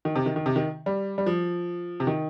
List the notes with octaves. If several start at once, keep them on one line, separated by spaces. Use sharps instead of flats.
D#3
C3
D#3
D#3
C3
D#3
G3
G3
F3
C3
D#3